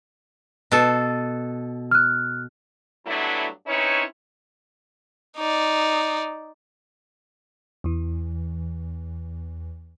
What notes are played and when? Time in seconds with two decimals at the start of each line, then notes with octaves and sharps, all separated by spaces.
0.72 B2 A4
1.91 F6 F#6
3.06 G2 F#3 A3 B3 D4 E4
3.67 C4 C#4 D#4 E4 B4 C#5
5.37 D#4 D5
7.84 E2 E3